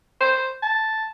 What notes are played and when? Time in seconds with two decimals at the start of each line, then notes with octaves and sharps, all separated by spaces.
0.20 C5
0.62 A5